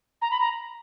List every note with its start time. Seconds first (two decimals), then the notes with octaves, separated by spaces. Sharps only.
0.21 A#5
0.31 B5
0.40 A#5